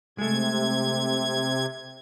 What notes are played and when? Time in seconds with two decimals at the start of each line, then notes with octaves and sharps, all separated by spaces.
0.18 C3 G#3 A3 G#6